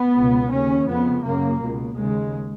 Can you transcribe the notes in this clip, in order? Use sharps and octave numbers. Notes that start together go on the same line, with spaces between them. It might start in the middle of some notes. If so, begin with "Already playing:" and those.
Already playing: B3
C#2 B2
D#2 C#3 C#4
F2 C#3 B3
F#2 C#3 A#3
C#2 B2
D#2 C#3 G#3